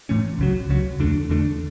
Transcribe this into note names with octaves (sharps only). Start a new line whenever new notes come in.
A2 E3 A3 C#4
C#2 C#3 F#3
C#2 C#3 F#3
E2 D3 A3 D4
E2 D3 A3 D4